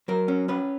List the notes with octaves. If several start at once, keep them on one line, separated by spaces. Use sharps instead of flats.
F#3 A#4
C#4
C#4 B4